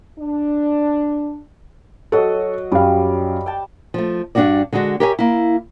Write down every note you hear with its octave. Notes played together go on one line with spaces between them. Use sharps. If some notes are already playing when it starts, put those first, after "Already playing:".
D4
F#3 F#4 A4 D#5
F#2 G3 F5
G5 A5
F3 A3
G2 G3 D4 E4 F#4 D5
D3 G#3 D4 F#4
G4 A#4 C#5 E5 F5 G#5
A#3 E4